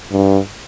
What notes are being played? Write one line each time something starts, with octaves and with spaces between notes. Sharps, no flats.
G2